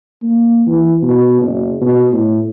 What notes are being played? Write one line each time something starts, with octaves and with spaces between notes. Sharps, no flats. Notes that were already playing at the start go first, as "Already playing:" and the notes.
A#3
E3
B2
F#1
B2
A2